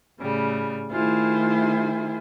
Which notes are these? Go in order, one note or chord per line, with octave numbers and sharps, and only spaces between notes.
A2 C#3 G3
D#3 A3 E4 F4 G#4 C5